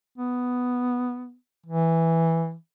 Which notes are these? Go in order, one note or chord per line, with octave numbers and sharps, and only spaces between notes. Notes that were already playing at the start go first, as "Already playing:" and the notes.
B3
E3